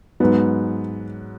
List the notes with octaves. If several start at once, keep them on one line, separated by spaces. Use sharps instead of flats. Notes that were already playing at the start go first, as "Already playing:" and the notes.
G#2 F#3 B3